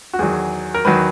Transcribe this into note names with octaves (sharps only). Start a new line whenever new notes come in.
F#4
E2 D#3 F#3 G#4
A#4
E2 D#3 F#3 B4